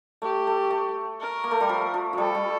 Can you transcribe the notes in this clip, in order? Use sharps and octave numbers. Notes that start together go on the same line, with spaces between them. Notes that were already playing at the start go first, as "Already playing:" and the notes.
A3 G4
A3
A3
A#4
A#3
A3
G3
F3
F3
F3 G3 A4
G3